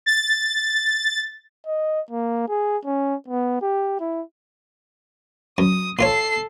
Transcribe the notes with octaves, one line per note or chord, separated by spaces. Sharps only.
A6
D#5
A#3
G#4
C#4
B3
G4
E4
F#2 D#6
A#2 F4 A4 C#5 C7